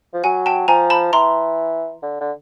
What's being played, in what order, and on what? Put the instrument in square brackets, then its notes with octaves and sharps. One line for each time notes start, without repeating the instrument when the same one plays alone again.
[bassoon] F3
[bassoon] F#3 [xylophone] F#5 G#5
[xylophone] G5 A5
[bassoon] F3 [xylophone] G#5 A#5
[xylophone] A5 B5
[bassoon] E3 [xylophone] A#5 C6
[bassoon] D3
D3